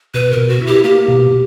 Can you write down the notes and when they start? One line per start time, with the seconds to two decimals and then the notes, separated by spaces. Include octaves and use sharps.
0.14 B2 B4
0.32 A#4
0.37 B2
0.48 F#4
0.61 E4
0.66 G4
0.84 A#3 G4
1.08 B2